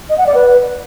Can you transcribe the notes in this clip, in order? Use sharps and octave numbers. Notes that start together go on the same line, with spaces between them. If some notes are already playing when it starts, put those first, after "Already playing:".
D#5
F#5
D5
B4